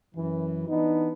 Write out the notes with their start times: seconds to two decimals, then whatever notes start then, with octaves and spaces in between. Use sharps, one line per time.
0.15 F#2 E3
0.69 E3 B3 D4 D#4